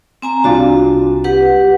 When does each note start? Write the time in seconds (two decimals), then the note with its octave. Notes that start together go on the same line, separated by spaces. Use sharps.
0.22 C4 G#5 A#5
0.44 C2 D4 F4 F#4
1.24 G4 B4 F#5